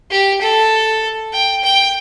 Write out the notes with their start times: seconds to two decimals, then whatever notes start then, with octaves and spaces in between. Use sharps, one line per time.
0.11 G4
0.42 A4
1.33 G5
1.63 G5